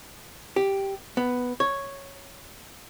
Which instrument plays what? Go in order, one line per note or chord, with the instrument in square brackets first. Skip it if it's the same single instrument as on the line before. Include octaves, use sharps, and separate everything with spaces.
[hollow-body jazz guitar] G4
B3
C#5